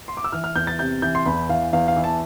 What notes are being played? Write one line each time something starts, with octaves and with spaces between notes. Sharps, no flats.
C6
D6
E6
E3 F6
F6
E2 G6
A6
C3 G6
E3 G6
C6
E2 B5
E3 F5
E2 F5
F5
E3
A5